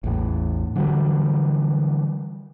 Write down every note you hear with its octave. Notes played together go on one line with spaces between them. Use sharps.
A1 E2 A2
D3 E3 F#3 G3